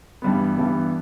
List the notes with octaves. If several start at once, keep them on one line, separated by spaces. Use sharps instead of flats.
G2 E3 G3 B3
G2 E3 G3 B3